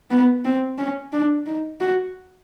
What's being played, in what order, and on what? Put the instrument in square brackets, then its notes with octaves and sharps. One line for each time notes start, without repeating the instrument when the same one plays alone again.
[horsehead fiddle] B3
C4
C#4
D4
D#4
F#4